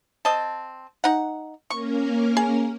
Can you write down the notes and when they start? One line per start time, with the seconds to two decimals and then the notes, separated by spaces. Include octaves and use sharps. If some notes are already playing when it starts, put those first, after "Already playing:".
0.25 C4 D#5 A5
1.04 D#4 F#5
1.70 A#3 C#4 A#4 C#6
2.37 G#4